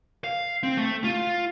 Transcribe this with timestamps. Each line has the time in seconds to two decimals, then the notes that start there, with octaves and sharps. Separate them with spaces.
0.24 F5
0.63 C4
0.78 A3
1.04 F4